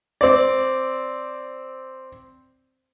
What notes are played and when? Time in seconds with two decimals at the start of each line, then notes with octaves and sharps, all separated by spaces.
0.21 C4 D5